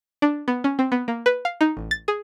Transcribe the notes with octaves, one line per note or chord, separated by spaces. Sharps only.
D4
B3
C#4
C4
B3
A#3
B4
F5
D#4
A1
A6
G#4